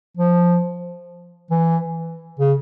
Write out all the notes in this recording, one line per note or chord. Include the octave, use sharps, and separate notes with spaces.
F3
E3
C#3